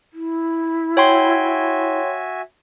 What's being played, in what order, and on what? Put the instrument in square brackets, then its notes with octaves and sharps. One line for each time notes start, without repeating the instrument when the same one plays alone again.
[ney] E4
[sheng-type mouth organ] F#4 E5 G#5 [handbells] C#5 G5 C6